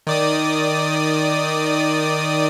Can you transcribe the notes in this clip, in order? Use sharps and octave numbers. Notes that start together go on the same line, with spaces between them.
D#3 D5 D#6